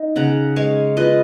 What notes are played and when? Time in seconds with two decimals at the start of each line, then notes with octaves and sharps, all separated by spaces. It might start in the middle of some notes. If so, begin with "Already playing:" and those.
Already playing: D#4
0.16 C#3 F#5 A#5
0.56 G#3 C#5 F5
0.97 F4 B4 D#5